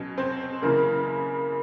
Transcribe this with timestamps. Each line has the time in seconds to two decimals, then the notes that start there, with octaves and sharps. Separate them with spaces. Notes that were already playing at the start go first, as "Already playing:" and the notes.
Already playing: B2 F#3 C#4
0.18 C4 C5
0.62 F#2 C#3 E3 A#3 A#4